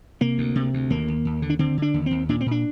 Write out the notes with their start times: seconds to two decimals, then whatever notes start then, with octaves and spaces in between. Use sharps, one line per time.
0.21 C3 A#3
0.38 D2
0.55 C3
0.74 D2
0.90 D#2 A#3
1.08 D#2
1.25 D#2
1.42 D3
1.50 D4
1.59 D3 C4
1.78 D3 D4
1.94 D#2
2.06 D#2 C4
2.29 A#2 D4
2.41 C4
2.46 A#2
2.51 D4